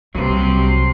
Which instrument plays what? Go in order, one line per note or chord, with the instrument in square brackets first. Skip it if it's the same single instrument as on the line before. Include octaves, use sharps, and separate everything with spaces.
[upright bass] C2 [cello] C3 C5 [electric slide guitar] F#3 G3